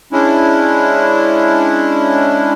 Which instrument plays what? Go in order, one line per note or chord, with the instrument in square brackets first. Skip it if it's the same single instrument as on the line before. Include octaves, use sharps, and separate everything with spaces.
[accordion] G#3 C#4 D4 E4